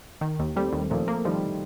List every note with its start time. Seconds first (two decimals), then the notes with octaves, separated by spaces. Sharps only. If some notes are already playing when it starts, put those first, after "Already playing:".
0.21 D#3
0.39 D#2
0.56 G3 A3 C4
0.73 D#2
0.90 A#2 F3 A3
1.08 A#3
1.25 D#3 F3 G3